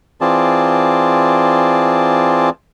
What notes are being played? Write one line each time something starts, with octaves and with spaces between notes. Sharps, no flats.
E3 C4 F4 G#4 D5 A5